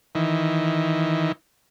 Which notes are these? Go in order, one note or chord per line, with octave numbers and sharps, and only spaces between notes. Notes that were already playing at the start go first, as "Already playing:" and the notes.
D#3 E3